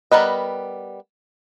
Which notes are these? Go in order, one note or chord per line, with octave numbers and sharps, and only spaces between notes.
G3 B3 A#4 B4 D#5